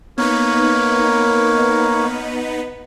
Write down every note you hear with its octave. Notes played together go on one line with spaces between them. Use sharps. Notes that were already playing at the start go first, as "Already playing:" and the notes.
A#3 B3 D#4 A#4 B4 C#5